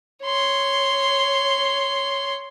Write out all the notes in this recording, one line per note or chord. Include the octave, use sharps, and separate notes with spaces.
C#5 C6